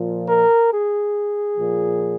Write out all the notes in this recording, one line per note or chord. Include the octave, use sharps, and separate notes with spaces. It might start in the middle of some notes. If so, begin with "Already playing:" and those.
Already playing: A#2 F3
A#4
G#4
A#2 F3